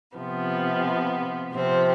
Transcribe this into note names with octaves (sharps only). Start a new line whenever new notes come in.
C3 F3 B3
C3 F3 C4